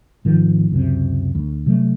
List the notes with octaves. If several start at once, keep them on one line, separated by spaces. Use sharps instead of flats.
G#1 D#3 F3
C#2 F#2 C3
D2
C3 F#3 A3